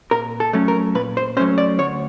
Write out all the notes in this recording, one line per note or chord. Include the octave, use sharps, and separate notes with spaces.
A#2 A#4
A4
F#3 A3 C#4
A#4
A#2 B4
C5
F#3 A3 C#4 C5
D5
D2 C#5